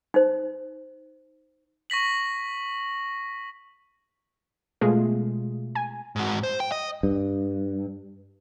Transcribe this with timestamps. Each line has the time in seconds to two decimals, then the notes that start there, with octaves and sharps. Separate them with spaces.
0.14 D#4 C5
1.90 C#6 A#6 B6 F#7
4.81 B2 G#3 A3 F4 G#4
5.75 G#5
6.16 G#2 F#4
6.43 C5
6.60 G5
6.72 D#5
7.03 G2